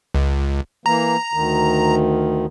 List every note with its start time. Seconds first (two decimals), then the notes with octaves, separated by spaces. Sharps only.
0.15 C#2
0.86 E3 A#3 A#5
1.34 D2 D#3